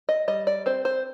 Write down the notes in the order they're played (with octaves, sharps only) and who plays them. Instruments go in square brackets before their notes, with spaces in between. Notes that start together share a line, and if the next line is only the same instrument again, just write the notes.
[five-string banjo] D#5
G3 D#5
D5
C4 C5
C5